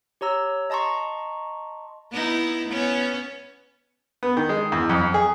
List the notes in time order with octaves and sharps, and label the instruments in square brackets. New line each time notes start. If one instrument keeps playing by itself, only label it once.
[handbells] G4 C#5 A#5 E6
D#5 A5 A#5 C6 C#6
[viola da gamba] B3 D#4 E4
B3 C#4
[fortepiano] B3
D#3
G#3
E2
F2
F2
G#4